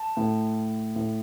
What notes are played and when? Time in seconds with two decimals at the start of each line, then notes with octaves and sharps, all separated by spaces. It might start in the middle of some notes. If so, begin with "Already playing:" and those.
Already playing: A5
0.17 A2
0.96 A2